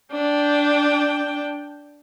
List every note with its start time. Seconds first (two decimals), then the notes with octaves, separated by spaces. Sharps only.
0.12 D4 G5